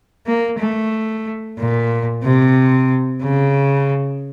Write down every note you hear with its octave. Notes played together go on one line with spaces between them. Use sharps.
A#3
A3
A#2
C3
C#3